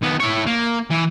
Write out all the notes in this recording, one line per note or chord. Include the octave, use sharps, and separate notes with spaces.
D#2 B3
E4 C#5
A#3
E3